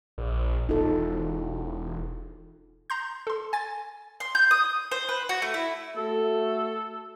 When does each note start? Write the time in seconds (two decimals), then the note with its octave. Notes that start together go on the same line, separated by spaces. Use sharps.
0.18 A#1
0.69 E1 D#4 F4 A4
2.90 A#5 C6 G6
3.27 A4 C6
3.53 G#5 A6
4.20 C6
4.35 G6
4.51 D#6
4.91 C5
5.09 B4
5.29 F#4
5.42 A3
5.54 E4
5.97 A3 F#4 A4